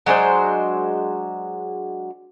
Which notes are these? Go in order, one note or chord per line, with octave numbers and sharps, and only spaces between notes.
F#3 G#3 D4 C5